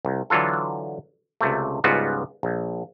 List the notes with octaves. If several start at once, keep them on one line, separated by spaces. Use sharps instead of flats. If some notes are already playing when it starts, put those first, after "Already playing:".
C2
D3 E3 F#3 F4 A4
C#2 C3 A3
C#2 G#2 G3 B3 F4 F#4
A#1